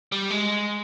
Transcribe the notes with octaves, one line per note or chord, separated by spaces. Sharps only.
G3
G#3